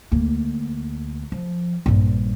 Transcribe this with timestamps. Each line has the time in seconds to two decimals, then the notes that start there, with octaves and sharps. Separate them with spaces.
0.12 D2 A#3
1.32 F3
1.86 A#1 G2